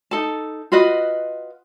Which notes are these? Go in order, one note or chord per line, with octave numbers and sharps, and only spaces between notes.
D#4 A4 A5
F4 F#4 B4 D#5